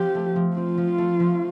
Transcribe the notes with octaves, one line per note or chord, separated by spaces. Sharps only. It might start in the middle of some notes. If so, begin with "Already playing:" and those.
Already playing: F3 C4 G4
A3
F3
C4 F4
F3
A3
F3